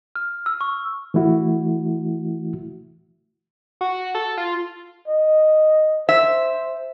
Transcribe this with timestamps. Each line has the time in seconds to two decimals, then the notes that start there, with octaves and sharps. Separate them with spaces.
0.16 F6
0.46 E6
0.61 C#6
1.14 E3 A3 E4 F#4
3.81 F#4
4.15 A4
4.38 F4
5.08 D#5
6.09 C5 E5